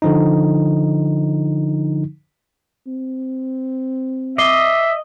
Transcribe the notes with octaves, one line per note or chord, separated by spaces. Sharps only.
D3 F3 D#4
C4
D#5 E5 D6 C7 G7